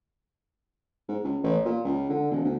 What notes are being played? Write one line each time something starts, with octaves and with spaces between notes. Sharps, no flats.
G#2
C#2
A1
A#2
C#2
D3
E1
D2